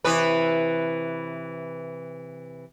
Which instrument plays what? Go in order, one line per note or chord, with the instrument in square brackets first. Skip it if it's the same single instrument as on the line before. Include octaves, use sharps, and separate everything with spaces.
[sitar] C3 E3 B4